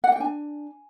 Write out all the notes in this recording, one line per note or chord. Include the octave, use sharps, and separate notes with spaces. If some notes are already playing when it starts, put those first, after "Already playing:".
F#5
G5
D4 G#5